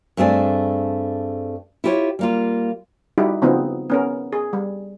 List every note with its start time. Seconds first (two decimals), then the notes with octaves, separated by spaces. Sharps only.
0.17 G2 A3 C4 G#4 D5
1.84 E4 F4 G4 A4 C#5
2.19 G3 A#3 F4
3.18 G3 D#4 E4 F#4 G4
3.42 C#3 F3 B3 C4 D#4
3.90 B3 C#4 A#4
4.33 G#4
4.53 G3